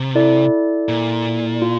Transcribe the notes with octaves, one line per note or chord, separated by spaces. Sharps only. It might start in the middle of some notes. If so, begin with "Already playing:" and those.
Already playing: C3
E4 A4 D5
A#2
F4